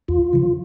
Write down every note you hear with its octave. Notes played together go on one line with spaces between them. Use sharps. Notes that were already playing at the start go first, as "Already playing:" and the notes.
E2 F4
C#3 F3